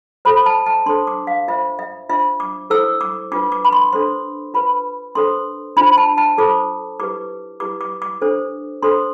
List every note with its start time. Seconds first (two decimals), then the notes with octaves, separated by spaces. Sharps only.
0.25 F4 A4 C5 B5
0.46 A5
0.66 A5
0.86 D4 A4 C5 C6
1.07 D6
1.27 F5
1.48 F4 C5 E5
1.79 E5
2.09 D4 F4 C5 E5
2.40 D6
2.70 E4 A4 C5 E6
3.01 D6
3.32 D4 F4 B4 D6
3.52 D6
3.65 B5
3.73 C6
3.93 D4 A4 C5 C6
4.54 F4 B4 B5
5.15 D4 A4 C5 C6
5.77 D4 F4 C5 B5
5.98 A5
6.18 A5
6.38 F4 A4 C5 D6
6.99 E4 G4 B4 D6
7.60 E4 G4 B4 D6
7.81 D6
8.02 D6
8.21 D4 A4 C5
8.82 D4 A4 C5 C6